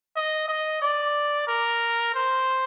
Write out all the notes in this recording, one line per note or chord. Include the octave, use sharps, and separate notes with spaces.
D#5
D#5
D5
A#4
C5